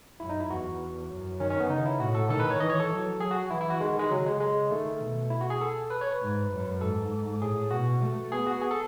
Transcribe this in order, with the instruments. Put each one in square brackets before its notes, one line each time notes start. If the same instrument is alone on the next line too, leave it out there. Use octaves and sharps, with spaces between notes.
[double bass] F#2 [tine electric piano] E4
[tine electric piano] D#4
E4
[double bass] E2 [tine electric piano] F#4
[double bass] F#2
[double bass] D#3 [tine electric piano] C#4
[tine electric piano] C#4
B3
[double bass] C#3 [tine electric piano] D#4
[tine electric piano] E4
[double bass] A2 [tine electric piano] F#4
[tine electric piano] A4
[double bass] D#3 [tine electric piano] A4
[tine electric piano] B4
C#5
[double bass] E3 [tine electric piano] D#5
[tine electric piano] C#5
A4
[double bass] F#3
[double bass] F#3 [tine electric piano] G#4
[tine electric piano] F#4
[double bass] E3 [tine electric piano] E4
[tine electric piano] E4
F#4
[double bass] D#3 [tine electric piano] G#3
[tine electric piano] G#3
[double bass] C#3 [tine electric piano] F#3
[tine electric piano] G#3
G#3
[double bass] D#3 [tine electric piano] A3
[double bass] B2
[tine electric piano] E4
F#4
G#4
A4
B4
C#5
B4
[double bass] G#2
F#2
[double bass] G#2 [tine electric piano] A4
[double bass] A2 [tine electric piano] G#4
[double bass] B2 [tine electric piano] F#4
[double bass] A3
[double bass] B3 [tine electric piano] G#4
[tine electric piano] F#4
G#4
A4